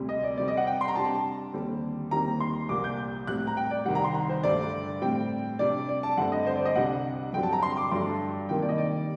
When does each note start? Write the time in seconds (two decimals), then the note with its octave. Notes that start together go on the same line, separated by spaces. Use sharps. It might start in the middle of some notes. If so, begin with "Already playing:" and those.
Already playing: D2 C3 G3
0.09 D#5
0.23 D5
0.38 C3 G3 C4 D5
0.48 D#5
0.57 F#5
0.67 G5
0.81 C6
0.88 A#5
0.96 C3 G3 D4 A5
1.15 A5
1.53 D#2 D3 G3 C4
2.11 D#2 D#3 G3 C4 A#5
2.40 C6
2.69 C2 A#2 G3 A#3 D6
2.84 G6
3.27 A2 G3 C4 F#6
3.47 A#5
3.57 G5
3.71 D5
3.86 C2 C3 D#3 G3 F#5
3.95 A#5
4.04 C6
4.14 A#5
4.30 C5
4.43 G2 D3 A3 D4 D5
5.02 A2 G3 C4 G5
5.59 C3 G3 D4 D5
5.89 D5
6.03 A5
6.17 G2 D3 A3 C4 F#5
6.32 D#5
6.47 C5
6.56 D5
6.65 D#5
6.75 C2 C3 G3 D4 F#5
7.33 G2 D3 F#3 C4 G5
7.43 A5
7.53 A#5
7.63 C6
7.77 D6
7.91 G2 F#3 A3 D4 C6
8.06 A5
8.49 C3 D#3 G3 A#3 G5
8.62 D5
8.69 D#5
8.78 D5